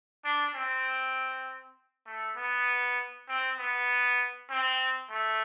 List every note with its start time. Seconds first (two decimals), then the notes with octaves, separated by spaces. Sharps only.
0.24 D4
0.55 C4
2.06 A3
2.37 B3
3.29 C4
3.58 B3
4.50 C4
5.10 A3